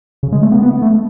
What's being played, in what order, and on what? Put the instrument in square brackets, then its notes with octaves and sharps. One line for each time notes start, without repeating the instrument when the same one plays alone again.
[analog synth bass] C#3
G#3
A3
B3
B3
A3